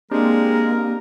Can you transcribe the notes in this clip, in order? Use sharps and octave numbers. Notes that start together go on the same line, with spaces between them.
G#3 A#3 C4 D4 G4 A#4